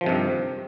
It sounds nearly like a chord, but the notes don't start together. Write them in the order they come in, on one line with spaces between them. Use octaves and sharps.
F3 D#3 C3 G2